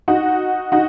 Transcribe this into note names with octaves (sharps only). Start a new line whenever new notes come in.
D#4 F#4
D#4 F#4